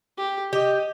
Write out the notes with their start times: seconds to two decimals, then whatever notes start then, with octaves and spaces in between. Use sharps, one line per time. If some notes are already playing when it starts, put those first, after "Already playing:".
0.18 G4
0.53 G4 D#5